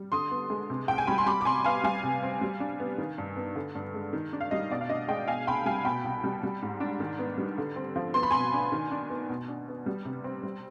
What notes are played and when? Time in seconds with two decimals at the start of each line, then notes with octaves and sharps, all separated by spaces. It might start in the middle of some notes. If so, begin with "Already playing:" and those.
Already playing: G3
0.12 D3 C6 D#6
0.31 B3
0.50 G#3
0.70 C3
0.88 C2 G5
0.98 G#5
1.07 G3 B5
1.18 C6
1.26 G3 B5 D6
1.41 D6
1.45 C3 G#5 C6
1.64 B3 F5 G#5
1.84 G3 F5 G#5
2.03 C3
2.23 C4
2.41 G3
2.60 D4
2.80 B3
2.98 D#3
3.18 G2
3.36 B3
3.56 D3
3.75 G2
3.94 G#3
4.13 D#3
4.33 D4
4.41 F5
4.51 G3 D#5
4.71 B2 D5
4.81 F5
4.89 D4 D#5
5.08 G#3 D#5 G5
5.28 B2 F5 G#5
5.47 C2 G5 B5
5.66 G3 F5 G#5
5.85 B2 G5 B5
6.04 C2
6.24 G3
6.43 G3
6.62 G#2
6.80 D4
7.00 D#3
7.19 B3
7.38 G3
7.58 D3
7.76 C4
7.96 F3
8.14 B3 C6
8.23 B5
8.31 B2 G#5 C6
8.53 D4
8.72 D#3
8.91 D4
9.10 B3
9.29 B2
9.48 D4
9.68 B3
9.86 G3
10.05 C3
10.24 C4
10.43 G3